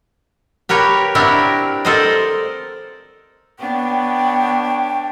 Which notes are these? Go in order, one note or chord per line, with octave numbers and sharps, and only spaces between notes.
G4 A#4 B4 C#5
C4 D4 E4 F#4 G4 A#4
A4 A#4 C5 D5 D#5
B3 D4 C#5 G5